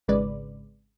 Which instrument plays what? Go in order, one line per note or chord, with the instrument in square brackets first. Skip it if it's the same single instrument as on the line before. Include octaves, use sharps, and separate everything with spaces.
[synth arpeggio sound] G#1 C#3 G#3 B4 D5